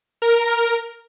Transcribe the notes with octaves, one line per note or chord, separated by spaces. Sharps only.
A#4